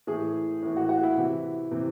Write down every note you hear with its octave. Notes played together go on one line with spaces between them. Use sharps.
A2 E3 G#4
A2 E3
F#4
F#4
E4
C3 E3
C3 E3